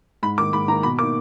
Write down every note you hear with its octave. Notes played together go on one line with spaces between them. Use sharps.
G#2 B5
D#3 A#3 D6
G#2 B5
D#3 A#3 A#5
B2 B5
A#3 D#4 D6